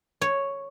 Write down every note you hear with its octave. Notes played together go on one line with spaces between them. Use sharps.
C#5